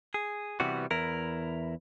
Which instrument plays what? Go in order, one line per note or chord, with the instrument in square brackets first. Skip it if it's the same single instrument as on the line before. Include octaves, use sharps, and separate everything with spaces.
[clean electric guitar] G#4
C3 E3 G3 B3 F#4
E2 E4 A#4